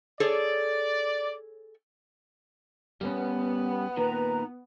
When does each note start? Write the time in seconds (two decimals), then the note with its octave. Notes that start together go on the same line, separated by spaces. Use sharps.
0.20 G#4 A4 C#5 D5
3.01 G3 B3 C#4
3.97 A#2 D#3 B4 A#5